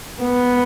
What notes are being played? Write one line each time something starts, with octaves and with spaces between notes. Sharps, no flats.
B3